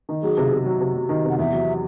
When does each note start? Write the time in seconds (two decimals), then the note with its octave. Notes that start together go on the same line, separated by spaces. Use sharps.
0.09 D#3
0.23 F#3 G#4
0.37 C3
0.51 C3
0.66 F#3
0.81 C3
0.94 F#3
1.09 D#3
1.25 C3
1.30 F#5
1.38 E2 E5
1.52 F#3